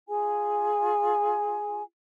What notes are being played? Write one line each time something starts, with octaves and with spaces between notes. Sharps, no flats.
F4 G#4 G#5